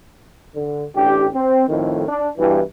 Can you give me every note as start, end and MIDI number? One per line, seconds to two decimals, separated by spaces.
0.54 0.85 50
0.96 1.26 33
0.96 1.26 62
0.96 1.26 67
1.34 1.64 60
1.68 2.05 41
1.68 2.05 45
1.68 2.05 51
2.08 2.29 62
2.38 2.60 43
2.38 2.60 47
2.38 2.60 52